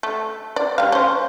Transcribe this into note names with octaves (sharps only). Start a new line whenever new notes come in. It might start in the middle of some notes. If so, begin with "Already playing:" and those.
A3
D5
G3 F5
C#4 C5